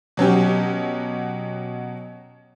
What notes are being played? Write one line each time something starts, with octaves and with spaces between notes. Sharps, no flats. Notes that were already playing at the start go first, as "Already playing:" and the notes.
B2 F#3 C#4 G4